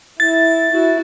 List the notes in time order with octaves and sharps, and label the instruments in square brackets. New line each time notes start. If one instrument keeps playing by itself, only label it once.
[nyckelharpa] E4 [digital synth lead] A6
[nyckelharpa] E4 F#4